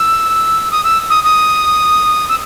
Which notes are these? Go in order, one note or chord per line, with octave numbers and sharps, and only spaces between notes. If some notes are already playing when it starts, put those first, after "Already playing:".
Already playing: E6
D#6
E6
D#6
D#6
E6